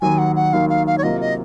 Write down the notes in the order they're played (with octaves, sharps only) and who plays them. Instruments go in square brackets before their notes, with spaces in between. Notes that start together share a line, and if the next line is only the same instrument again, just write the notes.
[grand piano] D#2 D#3 F#3 [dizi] G#5
[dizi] F#5
F#5
[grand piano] D#2 D#3 F#3 [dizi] F5
[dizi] F5
F5
C#5
[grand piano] C3 F#3 A#3 F4 [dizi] D#5
[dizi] D#5